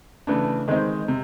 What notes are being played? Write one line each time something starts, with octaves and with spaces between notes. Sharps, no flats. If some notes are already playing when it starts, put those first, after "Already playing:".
C#3 E3 A3 D4
D#3 G#3 C4 D#4
C3